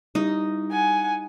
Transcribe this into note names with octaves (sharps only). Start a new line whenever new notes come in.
G3 D#4 E4 G4
F#5 G#5